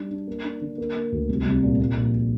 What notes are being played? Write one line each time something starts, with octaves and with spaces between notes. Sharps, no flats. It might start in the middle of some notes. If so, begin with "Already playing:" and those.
Already playing: G3 D4
D4
A#3
D4
D3
A#3
A#3
D2
C2
C2
A#2
A#2
A#1